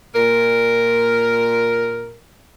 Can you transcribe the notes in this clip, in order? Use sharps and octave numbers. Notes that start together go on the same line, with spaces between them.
A#2 A#4